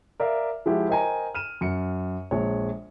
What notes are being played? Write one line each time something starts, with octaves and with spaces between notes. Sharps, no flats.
A#4 D5 E5 F5
F3 G#3 E4 F#4 G4
A#4 C5 D#5 G5 G#5 A#5
F6 D#7 E7
F#2 C#7
A#1 G#3 C#5